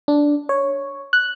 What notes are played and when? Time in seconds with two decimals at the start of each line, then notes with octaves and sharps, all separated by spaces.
0.08 D4
0.49 C#5
1.13 F#6